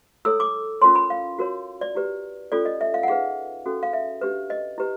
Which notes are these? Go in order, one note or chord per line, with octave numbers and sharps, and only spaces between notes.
E4 A4 C#5 E6
D6
C#4 F4 A#4 C#5 C6
B5
F5
F#4 A#4 C#5
D5
E4 G4 B4
C#4 F4 A4 D5
D#5
E5
F5
F#5
D#4 G#4 B4 F5
C#4 F#4 A4
F5
E5
D4 G4 B4
D#5
E4 G4 B4